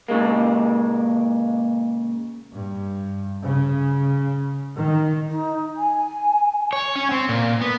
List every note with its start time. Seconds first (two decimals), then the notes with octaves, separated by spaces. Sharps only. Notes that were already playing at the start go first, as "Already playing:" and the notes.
0.09 A#2 C#3 G#3 A#3
2.54 G2
3.45 C#3
4.77 D#3
5.29 D#4
5.77 G#5
6.73 C#5
6.95 C#4
7.11 C4
7.29 A#2
7.61 B3